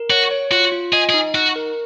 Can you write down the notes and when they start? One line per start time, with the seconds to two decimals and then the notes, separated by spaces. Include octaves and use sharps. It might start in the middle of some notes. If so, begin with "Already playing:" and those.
Already playing: A#4
0.10 F#4 C#5
0.31 C#5
0.51 F4 F#4
0.72 F4
0.93 G#4 D#5
1.09 G#4
1.14 D#4
1.35 D#4 F#4
1.56 A#4